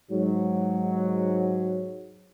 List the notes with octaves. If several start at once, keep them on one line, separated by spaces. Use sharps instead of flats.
G#2 F#3